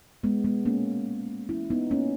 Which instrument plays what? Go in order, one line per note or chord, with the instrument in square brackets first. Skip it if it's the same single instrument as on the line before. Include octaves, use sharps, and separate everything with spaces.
[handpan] G#3 B3
G#3 B3
A#3 C#4
C#4 E4
B3 D#4
A#3 C#4